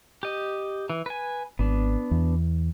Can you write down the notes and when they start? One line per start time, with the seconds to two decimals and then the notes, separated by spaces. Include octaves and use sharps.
0.23 G4 D#5
0.90 E3
1.06 B4 G#5
1.59 G#1 B3 D4
2.11 E2